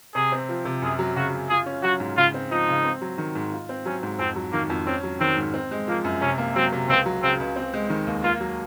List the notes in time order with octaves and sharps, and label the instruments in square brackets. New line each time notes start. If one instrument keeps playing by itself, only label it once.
[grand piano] C3 [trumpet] G#4
[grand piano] C4
F3
C3
[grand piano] F#2 [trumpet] G#4
[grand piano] F#3
[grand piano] C#3 [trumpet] F#4
[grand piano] F#2
[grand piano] F4 [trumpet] G#4
[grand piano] C#4
[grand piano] F#3 [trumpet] F#4
[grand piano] G#2
[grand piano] C#3 [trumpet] F4
[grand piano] C4
[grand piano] F3 [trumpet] D#4
[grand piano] C#3
C4
F#3
D#3
G#2
F4
C4
[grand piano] F#3 [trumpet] C#4
[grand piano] G#2
[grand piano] F2 [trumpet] C4
[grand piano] F#3
[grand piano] D#3 [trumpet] A#3
[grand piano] F2
[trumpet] C4 [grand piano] C#4
[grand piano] F#3
[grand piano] D#3 [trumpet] C4
[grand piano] G#2
C4
G#3
[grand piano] F3 [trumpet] A#3
[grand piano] F#2
[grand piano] C3 [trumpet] C#4
[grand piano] A#3
[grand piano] F#3 [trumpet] C4
[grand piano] C3
[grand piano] C#2 [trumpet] C4
[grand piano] F#3
[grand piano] C#3 [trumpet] C4
[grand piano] C#2
C4
G#3
D#3
D#2
[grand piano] A#3 [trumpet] F4
[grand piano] F#3